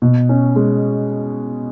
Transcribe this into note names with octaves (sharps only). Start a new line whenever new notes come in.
B2
C#4
G#3